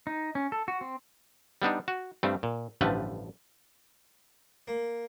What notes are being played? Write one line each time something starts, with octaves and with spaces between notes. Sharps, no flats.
D#4
C#4
A4
F#4
C4
G3 B3 D4 D#4
F#4
G2 G3 A3 C4
A#2
A1 G2 D3 F3 A3 B4
A#3